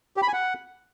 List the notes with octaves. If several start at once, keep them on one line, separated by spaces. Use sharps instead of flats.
G4
B5
G#5
F#5